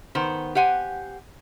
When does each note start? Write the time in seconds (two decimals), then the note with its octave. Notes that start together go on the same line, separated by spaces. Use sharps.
0.15 D#3 B3 C5
0.55 G4 C5 F#5 G#5